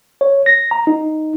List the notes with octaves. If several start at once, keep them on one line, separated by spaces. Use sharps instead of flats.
C#5
A#6
A#5
D#4